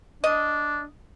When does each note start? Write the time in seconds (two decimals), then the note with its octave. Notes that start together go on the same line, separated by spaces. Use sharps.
0.24 D4 D#5